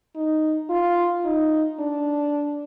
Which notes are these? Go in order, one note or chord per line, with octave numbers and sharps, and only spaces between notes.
D#4
F4
D#4
D4